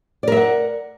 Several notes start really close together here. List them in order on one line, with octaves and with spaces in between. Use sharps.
D5 A#4 E5 F#5